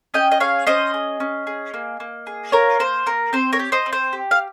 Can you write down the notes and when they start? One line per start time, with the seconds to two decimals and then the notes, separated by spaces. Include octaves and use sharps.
0.14 C#4 D#5 G5
0.32 D#5
0.40 G#4 C#5 F5
0.67 C#4 C5 D#5
0.94 G#4
1.20 C#4
1.47 G#4
1.74 A#3
2.00 A#3
2.27 G#4
2.52 F4 A#4 C#5
2.80 A#3 C5
3.06 A#3 A#4
3.33 C4 C5
3.53 A#4 C#5
3.59 G4
3.72 C5 D#5
3.86 C4
3.93 C5
4.13 G4
4.31 F5